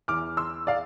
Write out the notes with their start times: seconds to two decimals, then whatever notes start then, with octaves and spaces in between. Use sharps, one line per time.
0.08 E2 E3 D6 F6
0.37 C6 E6
0.67 D5 F5